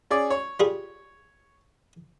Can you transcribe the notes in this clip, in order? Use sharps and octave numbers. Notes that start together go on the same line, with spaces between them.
C#4 G#4 D5
C#5
G3 F4 G#4